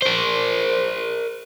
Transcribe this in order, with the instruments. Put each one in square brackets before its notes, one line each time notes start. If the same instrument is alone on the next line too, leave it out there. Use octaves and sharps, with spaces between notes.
[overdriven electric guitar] A#4 C5